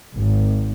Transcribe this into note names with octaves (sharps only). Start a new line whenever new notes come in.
G#1